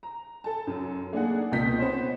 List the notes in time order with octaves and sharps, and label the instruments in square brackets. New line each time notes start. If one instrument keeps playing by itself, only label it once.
[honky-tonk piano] A#5
A4 A5
F#2 F#3
A3 A#3 D4 D#4 G#4 F#5
C#2 B2 A#3 D#5 G6 B6
B3 C#4 C5